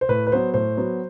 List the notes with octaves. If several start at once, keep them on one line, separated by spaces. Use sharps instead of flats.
C5
A2 B4
B4
F#3 B3 C5
A2 C5
F#3 B3